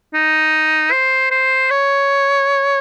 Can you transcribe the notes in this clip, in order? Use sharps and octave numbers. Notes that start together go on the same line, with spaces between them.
D#4
C5
C5
C#5